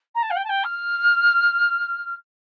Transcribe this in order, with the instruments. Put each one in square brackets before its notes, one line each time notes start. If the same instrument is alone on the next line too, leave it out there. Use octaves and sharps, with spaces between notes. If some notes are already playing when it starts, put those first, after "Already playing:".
[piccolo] A#5
A5
F5
G5
A5
G5
F6